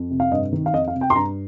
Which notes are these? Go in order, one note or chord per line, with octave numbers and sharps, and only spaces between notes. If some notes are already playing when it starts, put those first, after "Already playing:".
Already playing: F2
C3
F5
G2 D#5
D#3
F5
F2 D#5
F5
C3
G5
C6
G2 A#5